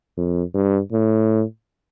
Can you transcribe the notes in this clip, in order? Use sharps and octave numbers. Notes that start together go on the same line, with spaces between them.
F2
G2
A2